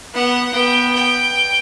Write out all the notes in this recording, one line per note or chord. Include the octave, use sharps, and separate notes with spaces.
B3 F#5
B3 G5
G5